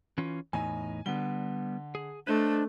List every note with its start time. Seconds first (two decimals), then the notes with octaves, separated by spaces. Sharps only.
0.18 E3 C#4 F4
0.53 E2 A2 D#4 G#5
1.06 D3 G3 B3 G7
1.95 G#4
2.27 A3 D4 B4 C5 D#5